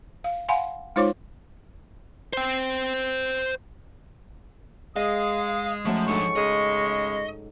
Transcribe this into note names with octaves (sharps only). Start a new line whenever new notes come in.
F5
F5 F#5 G#5 B5 C6
G#3 D#4 F4 C5 C#5 D6
C5 G5
G#3 D#5 F5 D#6
F#2 F3 A3 C#6
G#2 F3 D4 A4 C#6
C#3 G#3 D#5